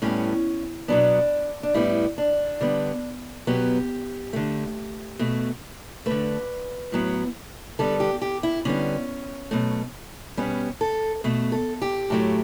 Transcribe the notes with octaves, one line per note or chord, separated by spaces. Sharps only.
A2 G3 B3 C#4
B2 F#3 B3 D4
D4
A2 G3 B3 E4
D4
D3 G3 B3
B2 F#3 B3 G4
D3 A3
B2 A3
D3 A3 B4
A2 F#3 B3
D3 G3 B3 A4
G4
G4
E4
D3 G3 B3 C#4
B2 F#3 A3
B2 G3 B3 C#4
A4
B2 A3
A4
G4
A2 F#3 A3